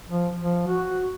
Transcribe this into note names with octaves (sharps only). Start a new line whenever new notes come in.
F3
F3
F#4